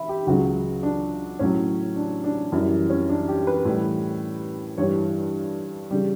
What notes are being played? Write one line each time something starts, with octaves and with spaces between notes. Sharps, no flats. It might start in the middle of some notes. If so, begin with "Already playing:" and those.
Already playing: E5 B5
G4
C#2 C#3 F#3 F#4
D4
A2 F#3 C#4
D4
D4
F#2 E3 G3 E4
C#4
D4
G4
B4
A2 E3 G3
G2 E3 G3 C#5
C#3 G3